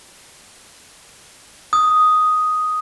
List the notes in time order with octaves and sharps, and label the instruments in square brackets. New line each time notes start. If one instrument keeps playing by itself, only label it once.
[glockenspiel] D#6